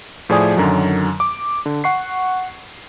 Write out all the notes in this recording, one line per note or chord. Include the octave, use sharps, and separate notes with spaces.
A2 F3 G#4 D5 G#5 D#6
F#2 D3 D#3 F#3
D6
D3
F#5 C#6 C7